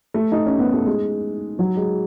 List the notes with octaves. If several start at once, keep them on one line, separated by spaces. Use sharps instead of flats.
A3
D#4
C#4
B3
A3
G#3
F#3
G#3